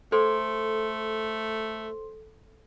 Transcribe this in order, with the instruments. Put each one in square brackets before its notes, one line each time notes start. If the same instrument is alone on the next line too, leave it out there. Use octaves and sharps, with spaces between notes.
[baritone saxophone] A3 [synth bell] A4 [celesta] C5 C6